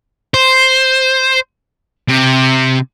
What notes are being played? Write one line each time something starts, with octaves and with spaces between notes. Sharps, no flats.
C5
C3